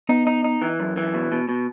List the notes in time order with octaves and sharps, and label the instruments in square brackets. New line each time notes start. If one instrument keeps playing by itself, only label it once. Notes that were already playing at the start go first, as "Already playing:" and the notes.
[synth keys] B3 [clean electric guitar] D#4
[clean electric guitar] D#4
D#4
E3
F#2
E3
B2
B2
B2